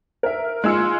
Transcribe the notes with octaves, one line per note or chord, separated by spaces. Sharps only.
A#4 E5
G#3 F4 E6 C#7